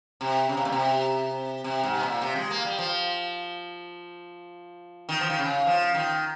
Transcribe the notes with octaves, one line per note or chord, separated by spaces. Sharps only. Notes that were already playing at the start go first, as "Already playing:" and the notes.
C3
C#3
C3
A#2
C3
C3
G#2
C3
A#2
C3
G#3
A#3
G3
F3
D#3
F3
D#3
C#3
F3
D#3